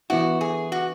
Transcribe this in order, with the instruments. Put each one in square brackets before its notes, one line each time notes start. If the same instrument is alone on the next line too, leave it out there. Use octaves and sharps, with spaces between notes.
[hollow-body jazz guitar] E3 B3 E4 [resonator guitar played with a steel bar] F#4
[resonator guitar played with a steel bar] G#4
F#4